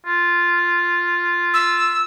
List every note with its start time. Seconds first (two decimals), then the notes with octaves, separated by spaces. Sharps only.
0.06 F4
1.54 E6